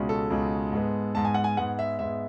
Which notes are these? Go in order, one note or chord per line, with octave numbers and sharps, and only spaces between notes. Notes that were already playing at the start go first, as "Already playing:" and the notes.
Already playing: C#2 B2 G#3 C#4
A4
C#2 B2 G#3 C#4
G#2 G#3 B3
G#2 G#3 B3 A5
G#5
F#5
G#5
G#2 G#3 B3 F#5
E5
G#2 G#3 B3 E5